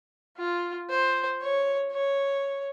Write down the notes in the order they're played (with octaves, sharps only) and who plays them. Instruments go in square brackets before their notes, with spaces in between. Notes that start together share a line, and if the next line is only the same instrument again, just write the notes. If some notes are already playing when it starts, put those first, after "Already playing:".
[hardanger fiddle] F4
C5
C#5
C#5